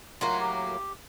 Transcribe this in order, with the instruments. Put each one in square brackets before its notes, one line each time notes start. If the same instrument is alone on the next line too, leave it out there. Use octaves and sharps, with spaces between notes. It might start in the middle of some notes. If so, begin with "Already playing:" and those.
[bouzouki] A2 F#3 A#3 [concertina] F4
[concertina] G4